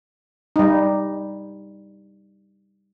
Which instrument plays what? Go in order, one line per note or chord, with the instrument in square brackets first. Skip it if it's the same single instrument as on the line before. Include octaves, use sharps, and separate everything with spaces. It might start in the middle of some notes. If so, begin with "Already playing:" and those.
[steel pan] G3 D#4